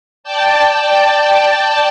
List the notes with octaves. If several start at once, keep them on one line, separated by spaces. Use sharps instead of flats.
D5 G5 A5